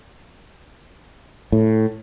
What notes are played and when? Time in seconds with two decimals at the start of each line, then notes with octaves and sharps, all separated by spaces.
1.52 A2